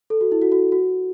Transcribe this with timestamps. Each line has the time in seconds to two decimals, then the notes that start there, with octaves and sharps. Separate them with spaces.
0.10 A4
0.21 F#4
0.32 E4
0.42 F#4
0.52 F#4
0.72 F#4